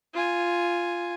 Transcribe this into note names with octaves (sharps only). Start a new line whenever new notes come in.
F4 G#5